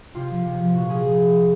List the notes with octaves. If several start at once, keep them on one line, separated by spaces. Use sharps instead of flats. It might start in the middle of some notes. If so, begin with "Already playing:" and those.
C3 F4
F3
C3
F3
A#2 F#4
F3 G#4